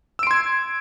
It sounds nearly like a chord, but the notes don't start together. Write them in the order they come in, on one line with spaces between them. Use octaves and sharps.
E6 D7 C6 G#6